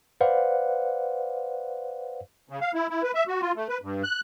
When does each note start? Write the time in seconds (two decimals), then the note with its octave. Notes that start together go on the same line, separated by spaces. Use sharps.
0.21 B4 C5 D5 F5 F#5
2.49 C#3
2.61 F5
2.74 E4
2.90 E4
3.03 B4
3.15 E5
3.28 F#4
3.41 F4
3.56 A3
3.69 B4
3.82 G2
4.04 F#6